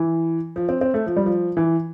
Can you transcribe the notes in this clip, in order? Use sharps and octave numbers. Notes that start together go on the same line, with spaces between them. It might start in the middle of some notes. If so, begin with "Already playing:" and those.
Already playing: E3
F3
C4
C4
A3
F3
G3
F3
E3